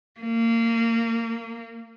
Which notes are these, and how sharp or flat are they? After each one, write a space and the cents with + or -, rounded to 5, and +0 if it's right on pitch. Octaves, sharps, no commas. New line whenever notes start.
A#3 -25